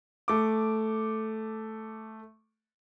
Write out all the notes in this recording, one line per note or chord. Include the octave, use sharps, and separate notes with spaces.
A3 D6